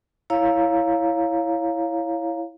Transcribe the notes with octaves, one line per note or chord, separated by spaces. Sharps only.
E4 C#5 F5 A#5